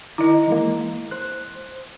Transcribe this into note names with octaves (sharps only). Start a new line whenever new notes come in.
D#3 E4 D#5 A#5
E3 G#3 A#3
C5 F#6